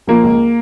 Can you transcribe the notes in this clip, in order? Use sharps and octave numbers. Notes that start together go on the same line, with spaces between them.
F3 A#3
C#2